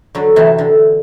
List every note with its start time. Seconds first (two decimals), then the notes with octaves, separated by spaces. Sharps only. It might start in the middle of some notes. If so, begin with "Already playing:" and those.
0.15 D3 F#3
0.36 C3 E3
0.58 D3